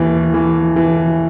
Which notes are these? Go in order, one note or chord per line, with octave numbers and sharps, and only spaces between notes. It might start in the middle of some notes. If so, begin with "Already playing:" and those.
Already playing: D#2 E3
E3
E3